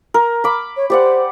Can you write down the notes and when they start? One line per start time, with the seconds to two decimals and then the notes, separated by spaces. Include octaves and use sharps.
0.14 A#4
0.44 B5 D6
0.76 C#5
0.90 G4 C5 D5 F#5